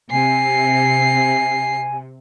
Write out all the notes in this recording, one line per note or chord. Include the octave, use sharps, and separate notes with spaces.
C3 G#5 C7